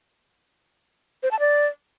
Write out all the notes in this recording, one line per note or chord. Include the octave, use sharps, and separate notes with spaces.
C5
A5
D5